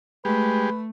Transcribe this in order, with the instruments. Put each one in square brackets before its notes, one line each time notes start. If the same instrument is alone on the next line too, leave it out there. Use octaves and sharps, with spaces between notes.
[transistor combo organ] G#3 G4 [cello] A3 [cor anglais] B4